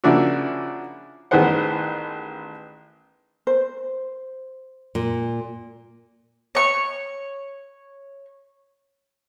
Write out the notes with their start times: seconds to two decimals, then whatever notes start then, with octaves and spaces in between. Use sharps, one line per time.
0.04 C#3 F3 A#3 D4 E4 F#4
1.31 A1 D#3 B3 G#4 C5 F#5
3.47 C5
4.95 A#2
6.55 C#5 C#6